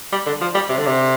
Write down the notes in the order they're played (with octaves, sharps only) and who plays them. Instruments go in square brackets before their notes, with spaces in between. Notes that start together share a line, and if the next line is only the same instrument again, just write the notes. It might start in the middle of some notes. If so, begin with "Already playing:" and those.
[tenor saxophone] G3
D3
F3
G3
C3
D3
C3